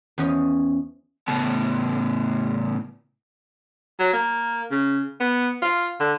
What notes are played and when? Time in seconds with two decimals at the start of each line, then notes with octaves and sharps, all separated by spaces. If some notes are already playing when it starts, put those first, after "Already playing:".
0.18 E2 F3 C#4 D#5
1.28 A2 C#3 B3 A5
4.00 F#3
4.14 A#3
4.71 C#3
5.20 B3
5.62 F4
6.00 D3